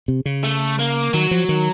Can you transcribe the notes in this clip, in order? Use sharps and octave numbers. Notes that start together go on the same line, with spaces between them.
C3
C#3
A3
A#3
D#3 F#3
F3
D#3